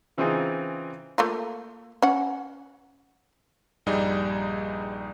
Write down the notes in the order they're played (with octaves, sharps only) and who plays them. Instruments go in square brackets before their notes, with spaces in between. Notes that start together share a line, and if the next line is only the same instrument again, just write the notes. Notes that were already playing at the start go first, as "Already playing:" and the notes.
[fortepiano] C#3 E3 C4 D#4 F4 G#4
[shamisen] A3 A#3 F4
C#4 F#5
[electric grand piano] A#1 G2 G3 D#4 G#4 D5